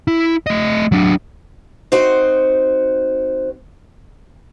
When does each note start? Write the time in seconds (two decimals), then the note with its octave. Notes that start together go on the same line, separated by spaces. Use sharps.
0.08 E4
0.47 A3 D#5
0.92 F#3 D4
1.92 C4 D#4 F#4 C5